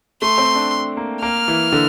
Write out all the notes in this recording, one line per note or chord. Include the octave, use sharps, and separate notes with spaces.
A3 C6
C4
D4
A#3
A#3 F6
E3
D3